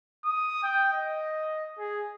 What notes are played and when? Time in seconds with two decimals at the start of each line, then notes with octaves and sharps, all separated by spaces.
0.25 D#6
0.63 G5
0.93 D#5
1.79 G#4